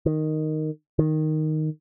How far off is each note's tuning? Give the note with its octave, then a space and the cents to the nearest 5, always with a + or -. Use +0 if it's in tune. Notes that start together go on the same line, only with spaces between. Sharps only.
D#3 -5
D#3 +0